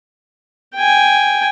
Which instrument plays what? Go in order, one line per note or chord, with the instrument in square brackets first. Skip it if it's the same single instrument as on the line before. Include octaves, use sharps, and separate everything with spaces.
[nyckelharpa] G5 G#5